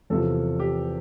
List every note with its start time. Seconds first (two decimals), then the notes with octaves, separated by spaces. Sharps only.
0.10 E2 C3 F3 A4
0.60 G4